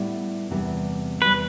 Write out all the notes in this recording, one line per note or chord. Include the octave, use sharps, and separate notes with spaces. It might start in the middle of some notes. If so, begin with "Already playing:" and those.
Already playing: A2 G3 B3 E4
E2 C3 G3
E2 C3 G3 B4